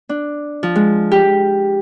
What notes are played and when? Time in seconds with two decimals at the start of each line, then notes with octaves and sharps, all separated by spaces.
0.09 D4
0.63 F3
0.76 G#3
1.11 G4